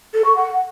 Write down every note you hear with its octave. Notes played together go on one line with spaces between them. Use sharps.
A4
C#6
F#5